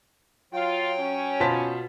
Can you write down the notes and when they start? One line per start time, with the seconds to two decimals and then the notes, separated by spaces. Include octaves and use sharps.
0.53 F#3 F4 G5
0.99 C#4
1.40 B2 F4 C5 A5 B6